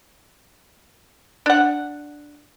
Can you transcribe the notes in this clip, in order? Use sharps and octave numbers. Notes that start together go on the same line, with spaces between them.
D4 F#5